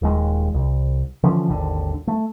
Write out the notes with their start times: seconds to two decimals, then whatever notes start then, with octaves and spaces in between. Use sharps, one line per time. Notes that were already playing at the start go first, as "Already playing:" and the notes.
0.02 D#1 D#2 D#3 G#3
0.54 C2
1.23 D3 E3 F3 C#4
1.49 G#1 D#2 D3
2.07 A3